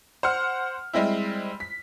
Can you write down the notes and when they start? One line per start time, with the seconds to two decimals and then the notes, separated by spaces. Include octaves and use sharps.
0.23 C5 F#5 F6
0.93 G3 G#3 C4 E4
1.60 B6